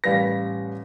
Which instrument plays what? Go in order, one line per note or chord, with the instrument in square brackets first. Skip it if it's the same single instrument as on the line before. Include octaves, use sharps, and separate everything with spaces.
[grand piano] A1 G3 A#6 [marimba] B4 F5